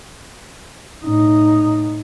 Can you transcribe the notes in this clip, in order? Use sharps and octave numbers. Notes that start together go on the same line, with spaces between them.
A2 D#4